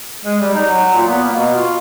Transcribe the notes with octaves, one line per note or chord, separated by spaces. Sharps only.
G#3
G3
D#4
F#3
A#2
B3
A#3
B2
F4